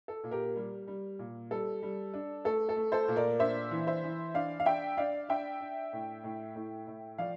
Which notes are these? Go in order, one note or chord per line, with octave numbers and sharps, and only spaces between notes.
A4
A#2
G4 A#4
G3
G3
A#2
G3 A4
G3
D4
A3 A4
A4
A3
A4 C5
A#2
A#4 D5
D4 C5 E5
E3
C5 E5
E3
D4 D5 F5
F5
D4 E5 G5
D4 D5 F5
D4 E5 G5
D4
A2
A2
A2
A2
F3 D5 F5